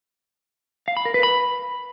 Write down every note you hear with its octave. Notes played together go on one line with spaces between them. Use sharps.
F5
B5
A#4
B4
B5